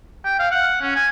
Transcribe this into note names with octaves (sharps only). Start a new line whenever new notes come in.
G5
F5
F#5
C#4
G#5